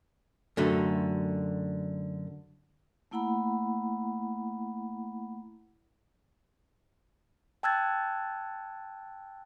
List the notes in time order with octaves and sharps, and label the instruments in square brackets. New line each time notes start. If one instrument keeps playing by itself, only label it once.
[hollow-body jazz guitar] F#2 D3 A3
[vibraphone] A3 A#3 E4 F#5 A#5 B5
[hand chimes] G5 A5 E6 F#6 G#6 A6